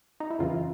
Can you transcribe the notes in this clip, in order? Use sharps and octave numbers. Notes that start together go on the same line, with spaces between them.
D#4
E4
F2 C#3 E3 F4